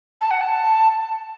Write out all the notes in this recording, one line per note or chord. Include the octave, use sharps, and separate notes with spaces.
A5
F#5
A5